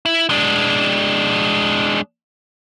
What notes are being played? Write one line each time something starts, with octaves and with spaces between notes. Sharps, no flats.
E4
G#3 D4